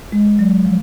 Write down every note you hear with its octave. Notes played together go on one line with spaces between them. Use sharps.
G#3
F#3
F3